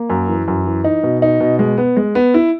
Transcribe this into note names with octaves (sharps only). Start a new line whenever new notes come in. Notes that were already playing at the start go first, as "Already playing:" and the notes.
Already playing: A#3
F#2
E3
F#2
E3
D#4
B2
D#4
B2
G#3
B3
G#3
B3
E4